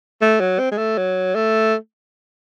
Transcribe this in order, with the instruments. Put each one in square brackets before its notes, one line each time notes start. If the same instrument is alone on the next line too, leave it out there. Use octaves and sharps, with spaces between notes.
[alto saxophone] A3
F#3
C4
G#3
A3
F#3
A3